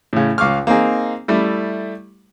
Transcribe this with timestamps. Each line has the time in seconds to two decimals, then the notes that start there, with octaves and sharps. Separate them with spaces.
0.13 A2 C#3
0.38 C#2 F5 C#6 D6 F6
0.67 A#3 C4 D#4 G#4
1.28 G3 A3 E4